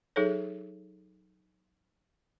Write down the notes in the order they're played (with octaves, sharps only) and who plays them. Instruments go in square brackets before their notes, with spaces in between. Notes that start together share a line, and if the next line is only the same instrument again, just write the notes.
[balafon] F#3 D#4 G#4 A4 C#5